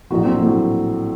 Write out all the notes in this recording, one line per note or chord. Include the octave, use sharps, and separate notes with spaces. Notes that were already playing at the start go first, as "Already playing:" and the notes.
A#1 A2 F#3 F#4
C4
A#1 A2 F#3